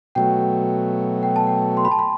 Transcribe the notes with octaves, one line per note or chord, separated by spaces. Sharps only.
B2 F#3 A3 G5
G5
A5
G5
C6
B5
A5
B5